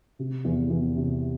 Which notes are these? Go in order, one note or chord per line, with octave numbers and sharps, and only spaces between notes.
C3
E2
E2
C3